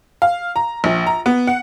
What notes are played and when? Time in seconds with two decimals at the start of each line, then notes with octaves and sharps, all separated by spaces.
0.22 F5
0.56 A#5
0.84 A#1
1.07 A#5
1.26 B3
1.47 F#5